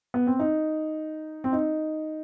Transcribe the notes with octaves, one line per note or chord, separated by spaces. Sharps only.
B3
C4
D#4
C4
D#4